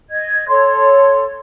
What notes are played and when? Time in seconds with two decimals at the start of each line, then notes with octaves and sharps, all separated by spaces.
0.10 D#5 G#6
0.48 A4 C#5 C6